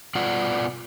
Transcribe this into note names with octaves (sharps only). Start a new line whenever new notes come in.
B2 F4 D5 F#5